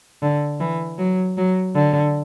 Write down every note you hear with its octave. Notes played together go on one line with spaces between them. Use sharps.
D3
E3
F#3
F#3
D3